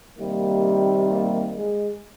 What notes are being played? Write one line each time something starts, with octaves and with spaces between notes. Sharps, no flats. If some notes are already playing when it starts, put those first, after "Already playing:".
C3 D#3 G3 A#3
A#3
G#3